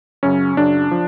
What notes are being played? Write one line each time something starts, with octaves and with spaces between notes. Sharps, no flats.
F#2 C#3 F#3 C#4
F#2 C#3 F#3 D4
F3